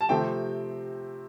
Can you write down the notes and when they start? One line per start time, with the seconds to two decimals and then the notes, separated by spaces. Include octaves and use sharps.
0.01 A5
0.09 C3 F3 A3 C4 G5